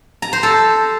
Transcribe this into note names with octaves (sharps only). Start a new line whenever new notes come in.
A#5
C5
A4